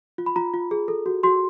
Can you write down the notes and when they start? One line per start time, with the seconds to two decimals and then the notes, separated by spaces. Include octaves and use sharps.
0.18 F4
0.26 B5
0.36 F4 A#5
0.54 F4
0.71 G#4
0.88 A4
1.06 F#4
1.23 F#4 C6